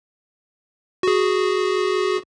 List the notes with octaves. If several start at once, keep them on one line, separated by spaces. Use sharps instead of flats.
F#4 G#4